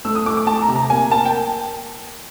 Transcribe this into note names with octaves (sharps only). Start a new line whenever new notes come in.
A3 E6
D#6
A3 D6
D6
A3 A5
A#5
C3
A#5
A#3 G#5
A#3 A5
G5